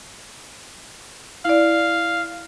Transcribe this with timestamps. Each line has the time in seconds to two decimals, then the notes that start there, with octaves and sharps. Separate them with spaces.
1.45 E4 D5 F5